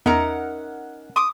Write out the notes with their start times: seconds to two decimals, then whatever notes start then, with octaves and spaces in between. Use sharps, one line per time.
0.06 E2 C#4 D#4 A#4 E5 F#5 A#5
1.16 C6 D6 D#6